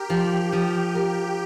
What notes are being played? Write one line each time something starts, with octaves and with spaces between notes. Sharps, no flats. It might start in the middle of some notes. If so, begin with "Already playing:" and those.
Already playing: G4 A#4
F3
F3
A#4